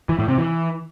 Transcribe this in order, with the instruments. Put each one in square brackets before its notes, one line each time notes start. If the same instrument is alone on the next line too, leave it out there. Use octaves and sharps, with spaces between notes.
[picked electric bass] E3
A2
C3
E3